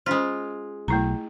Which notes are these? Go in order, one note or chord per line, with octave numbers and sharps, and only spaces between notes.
G#3 C#4 F4 C5
B1 A3 E4 A#5